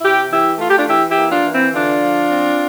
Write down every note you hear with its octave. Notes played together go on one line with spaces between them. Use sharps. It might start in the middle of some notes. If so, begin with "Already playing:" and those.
C3 E4 G4
E3 E4 G4
A3 F4
G4
D4 F4
E3 E4 G4
E4 G4
A#3
D4 F4
E3
C4 E4
D3 D4 F4
F3
C4